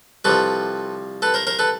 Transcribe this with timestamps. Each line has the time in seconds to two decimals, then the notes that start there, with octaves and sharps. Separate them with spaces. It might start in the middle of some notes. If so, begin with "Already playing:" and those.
0.25 C2 C3 F3 A4 B4
1.22 A4 B4
1.34 A#4 C5
1.47 A#4 C5
1.59 A4 B4